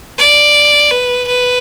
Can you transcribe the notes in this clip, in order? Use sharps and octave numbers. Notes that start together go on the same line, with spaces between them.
D5
B4
B4